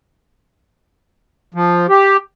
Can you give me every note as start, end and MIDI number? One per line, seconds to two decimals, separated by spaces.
1.54 1.87 53
1.89 2.17 67